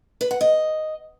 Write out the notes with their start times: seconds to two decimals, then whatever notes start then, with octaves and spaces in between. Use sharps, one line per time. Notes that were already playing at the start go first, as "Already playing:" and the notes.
0.21 B4
0.31 F#5
0.41 D#5